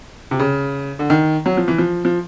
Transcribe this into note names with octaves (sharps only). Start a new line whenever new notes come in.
C3
C#3
D3
D#3
F#3
F3
E3
F3
F3